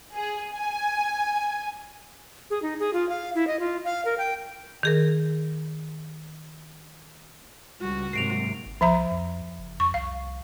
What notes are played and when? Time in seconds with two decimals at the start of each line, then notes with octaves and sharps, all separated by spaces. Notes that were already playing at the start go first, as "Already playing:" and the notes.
0.15 G#4
0.55 G#5
2.50 G#4
2.62 D#4
2.79 G#4
2.93 F4
3.09 F5
3.35 E4
3.47 D#5
3.60 F4
3.85 F5
4.05 A#4
4.18 G5
4.83 D#3 G#4 A#4
7.81 C#2 G3 F#4
8.13 G#2 C3 F#3 A#3 C7 D7 F7
8.65 G1
8.81 C2 F3 E5 A#5
9.11 F2
9.59 F#1
9.80 F2 C#6
9.94 C2 F5